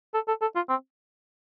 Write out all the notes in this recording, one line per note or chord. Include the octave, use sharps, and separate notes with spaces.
A4
A4
A4
F4
C4